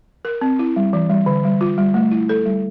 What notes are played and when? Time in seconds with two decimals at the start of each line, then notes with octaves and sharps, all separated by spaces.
0.25 A#4
0.41 C4
0.59 E4
0.76 G3
0.93 E3
1.10 G3
1.26 D3
1.44 G3
1.61 F4
1.78 G3
1.94 A3
2.11 E4
2.29 A4
2.46 G3